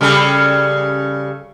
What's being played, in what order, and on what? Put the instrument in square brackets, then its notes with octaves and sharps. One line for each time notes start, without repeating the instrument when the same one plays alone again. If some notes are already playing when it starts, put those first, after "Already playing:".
[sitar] C#3 G3 A4